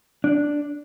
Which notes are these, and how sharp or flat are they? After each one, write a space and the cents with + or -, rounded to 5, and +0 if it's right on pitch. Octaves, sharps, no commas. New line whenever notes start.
D4 +0